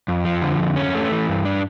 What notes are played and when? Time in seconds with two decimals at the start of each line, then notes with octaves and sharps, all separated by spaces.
0.08 F2
0.25 F3
0.42 D3
0.59 F2
0.76 C#4
0.95 A3
1.12 E3
1.29 G2
1.45 D4